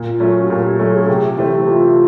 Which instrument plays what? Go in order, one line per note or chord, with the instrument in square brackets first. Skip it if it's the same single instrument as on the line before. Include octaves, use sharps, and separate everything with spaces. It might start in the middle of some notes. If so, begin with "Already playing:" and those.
Already playing: [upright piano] A#2
[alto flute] F4
[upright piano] F#3 A3 C#4
[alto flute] F#4
[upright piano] A#2 [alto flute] G4
[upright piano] F#3 A3 C#4 [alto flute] A4
[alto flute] G#4
[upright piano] C3 [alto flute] G4
[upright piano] E3 A3 C4
[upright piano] C3 [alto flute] F4